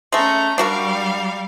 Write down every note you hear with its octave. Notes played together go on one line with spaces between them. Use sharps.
G#3 A3 C#4 A#5
G3 D4 F#4 A#4 F5